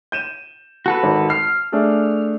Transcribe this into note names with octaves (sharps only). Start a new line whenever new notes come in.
G6 D#7 E7
F#4 A4 B4
G#1
F6 C7
A3 D4 G#4